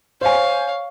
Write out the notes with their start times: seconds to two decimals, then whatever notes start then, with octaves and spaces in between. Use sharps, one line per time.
0.21 C5 C#5 F5 G#5